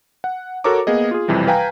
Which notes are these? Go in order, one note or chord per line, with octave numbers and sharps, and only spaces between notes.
F#5
F#4 A4 A#4 C#5 A#5 D6
A#3 B3 G#4 D#5
F4 G#4
B1 F2 C3 E3 G3
B4 F5 G5 G#5 A#5